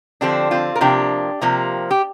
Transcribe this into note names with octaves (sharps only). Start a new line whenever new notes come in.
D3 F3 C4 D4 G4
C4 F4
A#4
C3 F3 A#3 D4 G4
C3 F3 A#3
G4